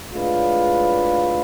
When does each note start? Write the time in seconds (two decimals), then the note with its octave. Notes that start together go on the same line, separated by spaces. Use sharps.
0.11 A2 G#3 D4 F4 B4